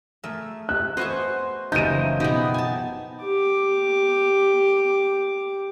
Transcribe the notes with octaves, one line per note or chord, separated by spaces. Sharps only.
A3 G#4 A#4 E5
E5 F#6
B3 F#4 C5 D#5 F#5 G#5 C6
F#1 E3 F3 D#4 A#4 G6 D#7
B2 B3 D#4 G4 G#4
G#5 A5
G4 D6